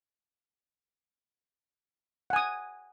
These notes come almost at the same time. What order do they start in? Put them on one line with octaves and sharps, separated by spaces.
F#5 G#5 D#6